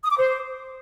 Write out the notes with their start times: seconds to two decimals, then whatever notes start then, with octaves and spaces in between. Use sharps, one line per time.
0.04 D#6
0.10 D6
0.17 C5